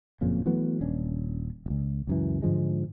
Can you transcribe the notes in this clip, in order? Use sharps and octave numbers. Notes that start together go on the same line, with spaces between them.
F#1 F2 A#2 C#3
E3 F#3 A3 B3
D#1 C#4 D4
D1 C#2
C#2 F#2 E3
G#2 D3 F3 G#3